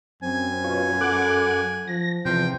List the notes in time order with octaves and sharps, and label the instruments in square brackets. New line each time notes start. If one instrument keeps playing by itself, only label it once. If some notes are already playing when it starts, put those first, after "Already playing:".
[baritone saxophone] F#2 [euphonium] C4 [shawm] G#5
[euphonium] B2 [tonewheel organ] F4 C#5
[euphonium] A4 [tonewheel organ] F#5 D6 F#6
[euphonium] F3 [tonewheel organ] A#6
[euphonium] E2 [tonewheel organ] C3 [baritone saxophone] F3 [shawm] G5